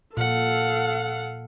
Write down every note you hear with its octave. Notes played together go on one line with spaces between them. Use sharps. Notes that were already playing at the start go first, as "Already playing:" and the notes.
A#2 A4 F5 F#5